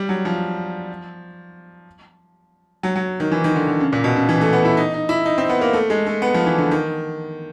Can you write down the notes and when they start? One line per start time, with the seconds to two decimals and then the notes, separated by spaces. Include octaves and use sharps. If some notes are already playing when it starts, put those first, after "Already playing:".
Already playing: G3
0.09 F#3
0.25 F3
2.83 F#3
2.96 F#3
3.20 D#3
3.32 E3
3.44 D#3
3.56 D3
3.68 D3
3.80 C#3
3.93 A#2
4.04 B2
4.16 C#3
4.29 E3
4.41 A3
4.53 B3
4.65 E4
4.77 D#4
4.94 D#4
5.09 E4
5.25 D#4
5.38 C4
5.50 B3
5.61 A#3
5.73 A3
5.90 G#3
6.07 A3
6.22 B3
6.34 F3
6.46 E3
6.58 D3
6.71 D#3